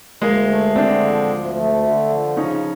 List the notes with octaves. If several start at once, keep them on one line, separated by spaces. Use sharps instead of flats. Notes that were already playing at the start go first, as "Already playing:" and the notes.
D2 G#3 A#3
A3
D3 C4 D4
F3
D2
A3
D3
F3
C#3 C#4 D#4